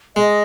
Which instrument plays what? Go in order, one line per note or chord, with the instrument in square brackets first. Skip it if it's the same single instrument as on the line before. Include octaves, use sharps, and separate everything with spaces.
[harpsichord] G#3 [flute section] D#5